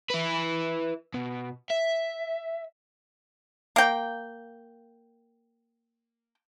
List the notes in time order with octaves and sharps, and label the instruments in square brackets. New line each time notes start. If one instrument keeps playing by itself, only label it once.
[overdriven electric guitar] E4 B4
B2
E5
[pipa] A#3 G5